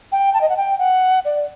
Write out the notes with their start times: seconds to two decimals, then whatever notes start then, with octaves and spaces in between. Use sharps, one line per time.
0.12 G5
0.34 A5
0.41 D#5
0.49 F#5
0.57 G5
0.79 F#5
1.25 D5